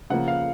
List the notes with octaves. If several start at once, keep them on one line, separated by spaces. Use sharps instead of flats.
C#3 F3 A#3 F#5
F5